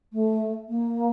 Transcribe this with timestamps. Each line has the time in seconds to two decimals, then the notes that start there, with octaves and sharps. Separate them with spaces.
0.13 A3
0.69 A#3